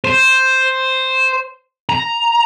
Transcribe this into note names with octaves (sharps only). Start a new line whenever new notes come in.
C5
A#5